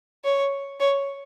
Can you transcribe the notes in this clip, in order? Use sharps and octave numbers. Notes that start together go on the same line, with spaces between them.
C#5
C#5